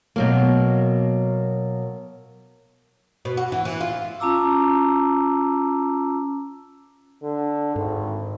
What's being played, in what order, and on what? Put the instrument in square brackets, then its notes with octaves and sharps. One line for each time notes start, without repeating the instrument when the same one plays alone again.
[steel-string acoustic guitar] B2 F#3 A#3
[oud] B2
F#4
E3
E3
F4
[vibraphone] C#4 F4 A5 A#5 D6 E6
[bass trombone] D3
[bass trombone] G#1 [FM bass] G#2